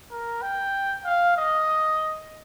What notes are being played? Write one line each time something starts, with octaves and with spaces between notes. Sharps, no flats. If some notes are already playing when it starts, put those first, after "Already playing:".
A#4
G5
F5
D#5